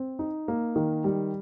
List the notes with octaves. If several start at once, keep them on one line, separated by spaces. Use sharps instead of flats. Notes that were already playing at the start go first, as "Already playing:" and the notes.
Already playing: C4
D#4
A#3
D#3
G3